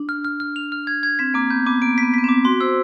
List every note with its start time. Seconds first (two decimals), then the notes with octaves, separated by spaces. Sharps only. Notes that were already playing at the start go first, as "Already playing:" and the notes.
Already playing: D4
0.09 F6
0.25 F6
0.40 F6
0.56 F7
0.72 F6
0.87 G#6
1.03 G#6
1.19 C4 B6
1.34 A#3 D6
1.50 B3 G6
1.66 B3 D6
1.82 A#3 D7
1.98 B6
2.03 B3
2.14 B3 B6
2.24 C4 D6
2.45 F#4 C6
2.61 C5 E6